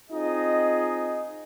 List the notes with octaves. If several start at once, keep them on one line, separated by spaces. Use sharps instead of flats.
C4 D#4 F4 G#4 D#5